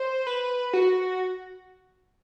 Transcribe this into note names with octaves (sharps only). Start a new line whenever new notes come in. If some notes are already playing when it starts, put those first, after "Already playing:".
Already playing: C5
B4
F#4